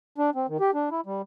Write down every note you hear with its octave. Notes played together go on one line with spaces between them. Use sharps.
D4
C4
D#3
G4
D4
E4
G3